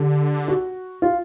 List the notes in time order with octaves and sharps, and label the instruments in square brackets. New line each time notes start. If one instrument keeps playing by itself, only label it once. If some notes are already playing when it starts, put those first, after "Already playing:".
Already playing: [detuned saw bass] D3 [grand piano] G4
[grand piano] F#4
F4